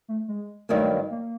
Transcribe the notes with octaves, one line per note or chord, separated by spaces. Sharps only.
A3
G#3
G2 D#3 F#3 A3 A#3
A#3